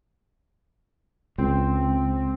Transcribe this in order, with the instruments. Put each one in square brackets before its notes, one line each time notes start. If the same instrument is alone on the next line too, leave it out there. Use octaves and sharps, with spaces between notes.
[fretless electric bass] C#2 [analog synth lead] C4